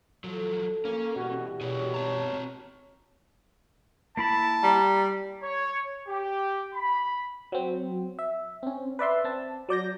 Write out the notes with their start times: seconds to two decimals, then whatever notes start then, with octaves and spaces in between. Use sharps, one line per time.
0.24 F3 F#3 A4
0.85 A#3 C#4
1.16 B2 E3 G3 F#4 G4
1.61 B2 E4 F#4 G#4 C#5
1.94 C4 A5 A#5
4.17 A#3 E4 A5 B5
4.63 G3 A#5
5.43 C#5
6.08 G4
6.74 B5
7.52 F#3 C4
8.19 E5
8.63 C4 C#4
8.99 B4 D5 E5 C6
9.24 C4 A5
9.69 F#3 D5 G6 A#6